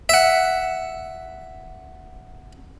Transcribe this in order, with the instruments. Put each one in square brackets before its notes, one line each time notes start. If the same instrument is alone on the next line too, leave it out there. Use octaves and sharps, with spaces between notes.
[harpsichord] E5 F#5